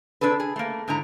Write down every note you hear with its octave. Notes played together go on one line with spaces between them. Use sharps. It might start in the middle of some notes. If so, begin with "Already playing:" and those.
C3 D4 G#4 A4 B4
G#4
A3 A#3
G#2 D3 E4 A#5